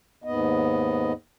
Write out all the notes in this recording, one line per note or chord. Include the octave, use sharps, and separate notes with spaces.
D#2 G#2 B3 D#5